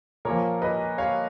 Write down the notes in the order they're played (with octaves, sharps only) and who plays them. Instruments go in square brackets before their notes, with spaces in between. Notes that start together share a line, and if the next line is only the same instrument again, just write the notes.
[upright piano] A#2 F3 A#3 A#4 C#5
B4 D#5
C#5 F5